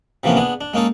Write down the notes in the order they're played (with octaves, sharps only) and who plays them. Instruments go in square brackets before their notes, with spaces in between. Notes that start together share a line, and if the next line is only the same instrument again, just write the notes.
[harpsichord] C3 E3 F3 A#3 B3 C#4
B3 D4 G#4
D4
G#3 A#3 C#4 D#4 A4